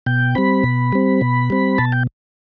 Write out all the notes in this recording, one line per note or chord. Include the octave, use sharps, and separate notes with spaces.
B2 G5
G3 C4 B5
B2
G3 C4
B2
G3 C4
B2 A5
G5